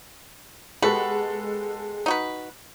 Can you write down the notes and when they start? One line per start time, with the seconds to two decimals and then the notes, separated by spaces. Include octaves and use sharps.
0.82 B2 G#3 F#4 G4 A4 B4
2.06 D#4 F#4 B4